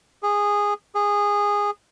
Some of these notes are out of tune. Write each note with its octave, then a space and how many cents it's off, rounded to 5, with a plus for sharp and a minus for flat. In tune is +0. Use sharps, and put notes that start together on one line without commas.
G#4 -15
G#4 -15